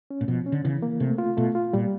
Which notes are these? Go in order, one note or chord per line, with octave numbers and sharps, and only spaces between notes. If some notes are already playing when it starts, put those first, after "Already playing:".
C#4
A#2
B2 F3
C#4
D3
C#3 E3
A#3
C3 A3
F4
B2 A3
F4
A#2 G3